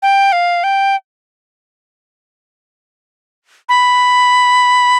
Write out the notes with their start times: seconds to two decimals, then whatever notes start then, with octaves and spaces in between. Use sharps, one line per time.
0.02 G5
0.32 F5
0.64 G5
3.69 B5